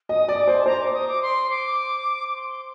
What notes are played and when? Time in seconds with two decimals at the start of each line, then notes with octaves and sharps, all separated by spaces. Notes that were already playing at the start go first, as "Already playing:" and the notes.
0.09 D#5 D#6
0.28 D5
0.38 D6
0.48 C5
0.60 A5
0.66 C5 A#5
0.80 D6
0.94 D#6
1.08 D6
1.22 C6
1.50 D6
2.28 D6
2.36 C6